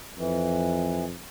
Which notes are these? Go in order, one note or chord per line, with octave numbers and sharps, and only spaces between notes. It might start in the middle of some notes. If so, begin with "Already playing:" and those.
F2 E3